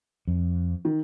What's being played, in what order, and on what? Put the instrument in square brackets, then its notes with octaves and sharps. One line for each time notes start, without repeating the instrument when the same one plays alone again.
[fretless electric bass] F2
[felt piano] D#3